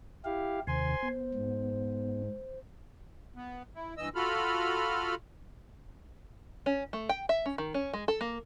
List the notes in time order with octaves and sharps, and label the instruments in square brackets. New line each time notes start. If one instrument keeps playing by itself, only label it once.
[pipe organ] E4 G4 F5
[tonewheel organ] D#2 C3 D#3 [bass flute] C5 [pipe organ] G#5 C6
[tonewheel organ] B3
[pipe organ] G#2
[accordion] B3
E4
G2 E3 D#5 E6
F4 F#4 A4 B5 F6
[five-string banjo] C#4
A3
G5
E5
C#4
D#3
C#4
G#3
A4
A#3